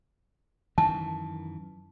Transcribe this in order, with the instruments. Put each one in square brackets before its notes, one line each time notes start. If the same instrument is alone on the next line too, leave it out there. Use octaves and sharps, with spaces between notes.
[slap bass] F#2 D#3 E3 [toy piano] A5